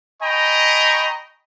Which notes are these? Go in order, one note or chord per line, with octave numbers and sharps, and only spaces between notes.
D#5 G5 G#5 A#5 B5 C#6